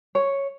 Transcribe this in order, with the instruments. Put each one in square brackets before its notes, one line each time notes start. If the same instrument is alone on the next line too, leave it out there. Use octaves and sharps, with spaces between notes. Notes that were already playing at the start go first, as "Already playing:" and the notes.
[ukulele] C#5